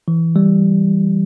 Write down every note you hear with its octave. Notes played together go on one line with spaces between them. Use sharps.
E3
G3